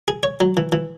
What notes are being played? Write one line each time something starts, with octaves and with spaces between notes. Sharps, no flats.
G#4
C#5
F#3
E3
E3